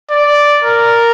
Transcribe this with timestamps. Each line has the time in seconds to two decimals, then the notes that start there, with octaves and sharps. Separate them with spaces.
0.11 D5
0.64 A#4